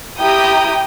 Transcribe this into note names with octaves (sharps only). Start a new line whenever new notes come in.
E4 G4 G5 A#5 D#6